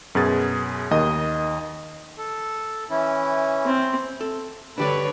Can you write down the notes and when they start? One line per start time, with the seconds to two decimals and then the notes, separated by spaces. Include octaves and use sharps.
0.15 F#2 B2 G#4 A6
0.91 D#2 D#3 D#5 D#6
2.18 A4
2.90 E3 C#4 E4
3.65 C4
4.21 A4
4.78 D3 D4 G4 B4 C#5 D5